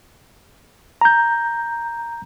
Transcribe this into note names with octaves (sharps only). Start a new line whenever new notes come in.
A#5 G6